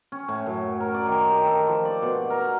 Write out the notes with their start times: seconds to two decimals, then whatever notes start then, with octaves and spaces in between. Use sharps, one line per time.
0.12 C#4
0.28 A2
0.46 F#2
0.80 A#4
0.94 D5
1.07 D#3
1.29 G4
1.47 A4
1.68 F3
1.85 D5
2.02 B2
2.30 A#4